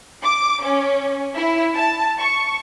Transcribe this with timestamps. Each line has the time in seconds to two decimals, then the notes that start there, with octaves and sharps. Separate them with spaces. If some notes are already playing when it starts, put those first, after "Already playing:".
0.23 D6
0.61 C#4
1.35 E4
1.75 A5
2.19 C#6